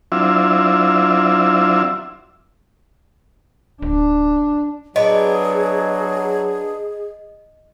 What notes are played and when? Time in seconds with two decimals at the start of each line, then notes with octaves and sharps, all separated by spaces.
0.12 F#3 C4 D4 E4 F4 E5
3.82 D1 D4
4.96 F#3 B3 D4 G#4 D#5